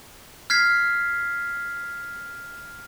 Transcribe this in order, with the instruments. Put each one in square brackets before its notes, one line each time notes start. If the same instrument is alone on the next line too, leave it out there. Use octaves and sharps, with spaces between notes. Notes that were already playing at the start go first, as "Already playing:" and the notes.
[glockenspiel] F6 G#6 B6 C7